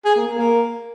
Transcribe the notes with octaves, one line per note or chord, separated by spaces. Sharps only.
G#4
A#3
A#3
A#3